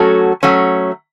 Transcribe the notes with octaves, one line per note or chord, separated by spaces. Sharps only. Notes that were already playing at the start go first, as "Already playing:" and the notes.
Already playing: F#3 A3 C#4 F#4 A4
F#3 A3 C#4